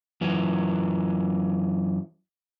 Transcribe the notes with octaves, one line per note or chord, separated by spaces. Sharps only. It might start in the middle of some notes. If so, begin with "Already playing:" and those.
F#2 E3 F#3